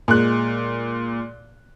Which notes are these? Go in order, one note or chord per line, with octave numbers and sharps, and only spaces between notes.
A#2 G#3 F#6